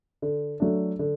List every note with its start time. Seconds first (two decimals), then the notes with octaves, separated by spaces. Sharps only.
0.22 D3
0.60 F#3 A3 D4
0.99 D3